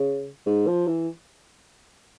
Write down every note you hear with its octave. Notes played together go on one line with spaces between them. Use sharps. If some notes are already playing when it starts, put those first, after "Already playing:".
Already playing: C#3
G#2
F3
E3